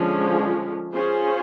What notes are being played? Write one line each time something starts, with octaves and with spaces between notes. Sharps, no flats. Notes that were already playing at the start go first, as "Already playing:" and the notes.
Already playing: D3 F3 G#3 C#4
C#4 F4 G#4 C5